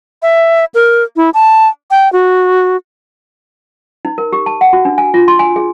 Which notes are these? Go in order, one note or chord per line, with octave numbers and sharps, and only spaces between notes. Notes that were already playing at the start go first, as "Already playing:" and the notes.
E5
A#4
E4
A5
G5
F#4
D#4
A#4
G4
A5
F#5
F#4
D4
G#5
F4
C6
G#5
G#4